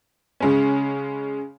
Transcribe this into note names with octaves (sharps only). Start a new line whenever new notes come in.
C#3 G#3 C#4